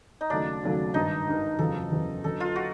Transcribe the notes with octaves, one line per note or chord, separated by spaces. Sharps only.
D#4
D#2 C#3 F#3 A3 D4
D#2 C#3 F#3 A3
G#1 G2 D#3 D#4
G#1 G2 D#3
F#1 E2 C#3 F3 A4
F#1 E2 C#3 F3
F#1 F#2 D3 A4
F4
F#4